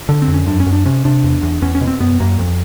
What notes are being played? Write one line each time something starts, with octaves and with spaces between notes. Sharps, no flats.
D3
C4
F2
C#4
F#2 D4
C#4
F#2
D4
C3 C#4
C3 D4
E2
E2
E2 C#4
C#4
B2
C4
F#2 B3
F#2 A#3
F2